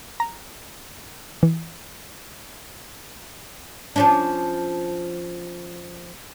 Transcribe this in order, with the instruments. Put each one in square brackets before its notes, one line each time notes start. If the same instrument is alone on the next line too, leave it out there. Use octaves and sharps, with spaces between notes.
[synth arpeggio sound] A#5
E3
[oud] F3 C#4 D4